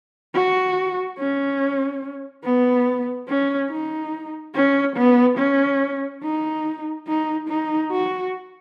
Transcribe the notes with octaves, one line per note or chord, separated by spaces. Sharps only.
F#4
C#4
B3
C#4
D#4
C#4
B3
C#4
D#4
D#4
D#4
F#4